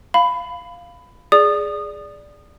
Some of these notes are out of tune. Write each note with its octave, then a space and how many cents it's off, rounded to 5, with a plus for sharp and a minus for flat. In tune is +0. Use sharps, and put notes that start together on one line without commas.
F5 +0 B5 +15
G#4 +0 D5 +0 D#6 -25